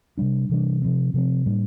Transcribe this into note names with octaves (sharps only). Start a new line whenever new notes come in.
C3 G3 D4
C3 E3 G3 D4
C3 F3 C4
C3 F3 C4
A2 G3 A#3 D4